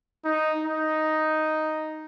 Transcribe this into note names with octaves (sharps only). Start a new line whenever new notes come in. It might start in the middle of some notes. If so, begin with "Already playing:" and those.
D#4
D#4